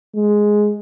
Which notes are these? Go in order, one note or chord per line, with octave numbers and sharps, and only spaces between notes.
G#3